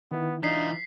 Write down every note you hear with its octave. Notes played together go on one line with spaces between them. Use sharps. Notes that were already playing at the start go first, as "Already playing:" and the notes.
D#3 B3 E4
E3 D4 D#4 F4 B6 C7